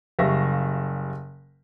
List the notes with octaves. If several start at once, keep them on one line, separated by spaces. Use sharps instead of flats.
F#1 G3 E5 F5 C#6 A#6